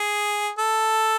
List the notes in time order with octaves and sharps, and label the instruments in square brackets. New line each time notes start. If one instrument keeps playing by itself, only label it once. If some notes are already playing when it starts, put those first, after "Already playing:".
Already playing: [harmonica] G#4
A4